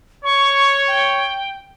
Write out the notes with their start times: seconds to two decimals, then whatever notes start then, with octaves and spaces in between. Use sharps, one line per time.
0.25 C#5 C#6
0.88 G5